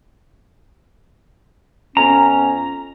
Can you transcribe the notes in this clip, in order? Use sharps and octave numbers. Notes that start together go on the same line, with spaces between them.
F2 B3 C#4 A#5